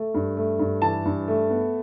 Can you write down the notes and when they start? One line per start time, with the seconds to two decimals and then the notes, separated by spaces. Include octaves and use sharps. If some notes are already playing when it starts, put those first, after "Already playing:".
Already playing: A3
0.14 G2
0.37 A3
0.59 G2
0.82 E3 A5
1.05 G2
1.28 A3
1.50 B3